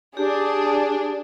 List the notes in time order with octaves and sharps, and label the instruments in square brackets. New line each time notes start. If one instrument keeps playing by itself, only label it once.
[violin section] D4 [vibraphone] G4 [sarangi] G#4